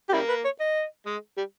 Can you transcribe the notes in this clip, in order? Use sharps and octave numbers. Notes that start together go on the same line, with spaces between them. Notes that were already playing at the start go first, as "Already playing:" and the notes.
G4
C#3 G3 A#3 E4
B4
C#5
D#5
G#3
G3